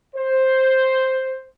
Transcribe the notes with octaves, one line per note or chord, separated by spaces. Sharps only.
C5